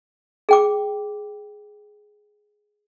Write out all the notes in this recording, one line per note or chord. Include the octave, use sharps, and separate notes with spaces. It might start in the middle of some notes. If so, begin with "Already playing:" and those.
G#4 G5 D6